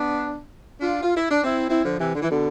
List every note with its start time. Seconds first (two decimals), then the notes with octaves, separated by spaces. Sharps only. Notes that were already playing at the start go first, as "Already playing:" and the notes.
Already playing: B3 D4
0.81 D4 F4
1.03 F4
1.17 E4
1.31 D4
1.44 C4 E4
1.69 C4 E4
1.85 D3 F3
1.99 C3 E3
2.14 D3
2.22 E3
2.31 B2 D3